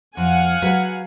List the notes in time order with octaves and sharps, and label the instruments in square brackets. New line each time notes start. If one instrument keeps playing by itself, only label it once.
[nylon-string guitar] F2 [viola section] F5 F#5 G#5
[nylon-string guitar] F#3 G#4 B4